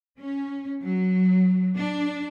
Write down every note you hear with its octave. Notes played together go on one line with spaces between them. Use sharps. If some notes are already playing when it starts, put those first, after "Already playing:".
C#4
F#3
D4